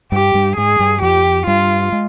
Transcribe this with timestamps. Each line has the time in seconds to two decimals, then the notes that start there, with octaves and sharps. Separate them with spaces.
0.12 G2 G3 G4
0.34 G2 G3
0.56 G#2 G#3 G#4
0.79 G2 G3
1.02 F2 F3 G4
1.47 G2 G3 F4
1.92 G#3